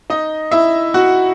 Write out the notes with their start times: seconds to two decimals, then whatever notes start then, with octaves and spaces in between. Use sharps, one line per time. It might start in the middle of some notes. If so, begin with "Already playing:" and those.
0.10 D#4 D#5
0.51 E4 E5
0.94 F#4 F#5